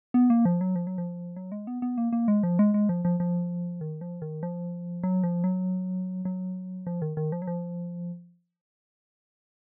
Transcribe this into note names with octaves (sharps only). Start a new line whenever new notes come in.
B3
A#3
F3
F#3
F3
F#3
F3
F#3
G#3
B3
B3
A#3
A#3
G#3
F3
G#3
G#3
F3
F3
F3
D#3
F3
D#3
F3
F#3
F3
F#3
F#3
F3
D#3
D#3
F3
F#3
F3